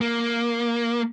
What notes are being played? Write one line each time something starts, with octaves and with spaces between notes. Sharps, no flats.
A#3